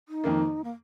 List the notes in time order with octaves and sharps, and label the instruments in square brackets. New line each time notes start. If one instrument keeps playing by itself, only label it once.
[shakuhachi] D#4
[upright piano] F2 D#3 A#3
[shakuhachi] A#3